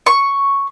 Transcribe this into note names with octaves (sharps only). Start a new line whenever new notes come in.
C#6